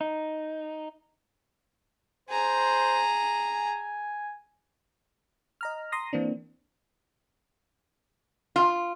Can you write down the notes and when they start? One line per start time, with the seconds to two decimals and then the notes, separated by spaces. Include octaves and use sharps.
0.01 D#4
2.30 G#4 C5 A#5
3.51 G#5
5.61 D#5 A#5 F6
5.92 A#5 C6 D#6 A#6
6.13 E3 A#3 C4 D4
8.56 F4